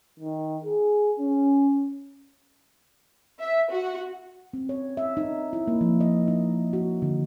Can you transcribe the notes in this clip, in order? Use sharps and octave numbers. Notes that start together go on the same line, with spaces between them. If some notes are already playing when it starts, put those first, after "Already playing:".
D#3
G#4
C#4
E5
F#4
C4
C#5
E5
D#4
E4
A#3
F3
D#5
D#4
F#4
D3